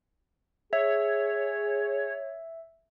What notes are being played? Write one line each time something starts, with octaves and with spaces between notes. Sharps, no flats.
G#4 C#5 E5